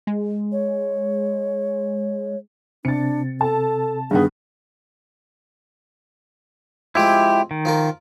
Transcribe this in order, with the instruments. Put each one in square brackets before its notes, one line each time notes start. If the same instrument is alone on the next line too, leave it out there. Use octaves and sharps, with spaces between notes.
[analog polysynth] G#3
[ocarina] C#5
[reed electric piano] C3 C4 [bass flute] D4 [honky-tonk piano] A6 C#7
[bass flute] A4 [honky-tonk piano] A5
[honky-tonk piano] G2 [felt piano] D3 D#3 B3 [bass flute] G#4
[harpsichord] F3 G#3 C4 [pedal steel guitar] E4 G4
[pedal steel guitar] D#3
[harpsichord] F3 F4 A#4